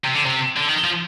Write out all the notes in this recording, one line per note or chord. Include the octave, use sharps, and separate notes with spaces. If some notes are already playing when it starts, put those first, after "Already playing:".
C3
D3
C3
D3
D#3
F3